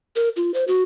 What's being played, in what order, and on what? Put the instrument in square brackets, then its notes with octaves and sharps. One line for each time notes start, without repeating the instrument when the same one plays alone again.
[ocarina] A#4
F4
C5
F#4